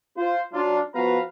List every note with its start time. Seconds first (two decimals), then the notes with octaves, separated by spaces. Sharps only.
0.17 F4 C5
0.53 F#3 D4 F4
0.94 F3 B3 F#4 B4 F5 A#5